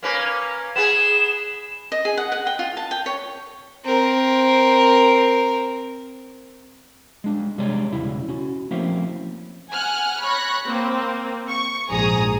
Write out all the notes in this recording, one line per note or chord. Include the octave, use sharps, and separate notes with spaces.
A#3 C#4 B4
B3 G#4 E7
D#5
G#4
F#5
F#5
G5
F4
A5
G5
C#5
C4 A#4
G#3 D4
C3 G3 G#3 C#5 D5
B1 E2 C#3 E4
C#4 F#4
F3 A3 A#3 C4 C#4 E4
F#5 G#5 F6 F#6
C#5 B5 C#6 F#6 A#6
A#3 C4
C#6
A#1 G#2 G#4 A#5 D#6